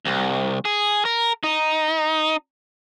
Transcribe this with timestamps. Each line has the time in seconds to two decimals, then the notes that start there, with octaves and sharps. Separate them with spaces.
0.05 C2
0.65 G#4
1.05 A#4
1.43 D#4